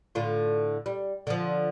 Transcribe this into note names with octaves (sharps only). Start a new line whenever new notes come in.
A2 D3 F4
G3
D3 F3